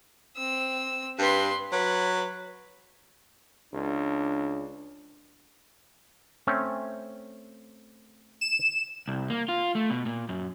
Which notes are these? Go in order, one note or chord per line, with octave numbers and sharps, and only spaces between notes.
C4 E6
G2 B4 C6
F#3 B4
C#2 D4
A3 C4 C#4
E7
C2
A#3
F4
A3
B2
A#2
F#2